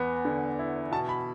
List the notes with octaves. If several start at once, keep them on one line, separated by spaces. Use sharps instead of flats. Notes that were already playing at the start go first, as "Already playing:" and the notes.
Already playing: E2 B3
D3
E4
B2 A5
B5